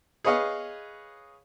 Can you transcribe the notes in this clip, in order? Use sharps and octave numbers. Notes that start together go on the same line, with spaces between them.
G#4 B4 C#5 D#5 F5